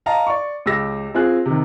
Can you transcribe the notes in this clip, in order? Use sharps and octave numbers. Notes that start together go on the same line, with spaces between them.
D#5 F5 A5 A#5
D5 C#6
C#2 G4 E6 A#6
C4 F4 G#4 G#5 F#6
C3 D#3